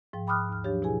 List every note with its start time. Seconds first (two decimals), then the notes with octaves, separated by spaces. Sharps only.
0.13 G#2 F3 G5
0.27 G5 B5 D6 D#6 F6 F#6
0.49 D#2 F6
0.64 F3 F#3 D4 G4 C#5
0.82 B2 E4 G4 G#4 G#5